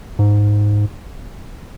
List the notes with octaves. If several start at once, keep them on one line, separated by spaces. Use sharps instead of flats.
G#2